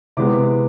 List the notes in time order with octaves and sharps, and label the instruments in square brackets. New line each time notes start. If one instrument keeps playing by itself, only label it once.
[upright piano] C3 E3 G#3 B3 D6